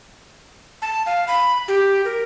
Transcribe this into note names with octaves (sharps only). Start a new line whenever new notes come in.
A5
F5
B5
G4
A#4